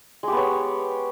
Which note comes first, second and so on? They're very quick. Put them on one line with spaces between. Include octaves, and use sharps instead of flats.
G#3 G4 B3 C#5